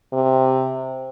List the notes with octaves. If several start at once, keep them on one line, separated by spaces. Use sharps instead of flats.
C3